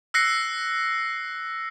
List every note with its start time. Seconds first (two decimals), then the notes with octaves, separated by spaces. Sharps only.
0.14 E6 F#6 A#6 C7 C#7